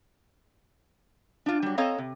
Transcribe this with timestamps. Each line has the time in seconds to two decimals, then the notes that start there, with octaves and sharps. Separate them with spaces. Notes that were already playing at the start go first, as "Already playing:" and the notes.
1.46 D4 F4
1.62 F#3 G3
1.78 C4 A4 C#5 D#5 F5 A#5
1.98 C3